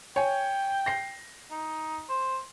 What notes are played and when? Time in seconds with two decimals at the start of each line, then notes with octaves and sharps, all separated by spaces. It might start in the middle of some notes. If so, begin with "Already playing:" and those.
0.16 C#5 G5 G#5
0.86 A#6 C7
1.51 D#4
2.09 C5